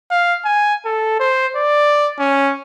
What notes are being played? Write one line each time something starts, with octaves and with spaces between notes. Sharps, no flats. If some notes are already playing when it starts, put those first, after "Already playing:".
F5
G#5
A4
C5
D5
C#4